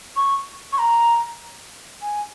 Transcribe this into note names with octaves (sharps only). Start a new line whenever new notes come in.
C#6
C#6
A#5
G#5